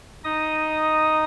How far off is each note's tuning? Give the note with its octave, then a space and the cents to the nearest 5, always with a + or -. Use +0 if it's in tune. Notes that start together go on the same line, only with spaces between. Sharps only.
D#4 +0 D#5 +0 D#6 +0